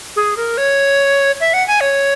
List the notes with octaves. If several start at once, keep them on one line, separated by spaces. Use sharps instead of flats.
G#4
A#4
C#5
E5
F#5
G#5
C#5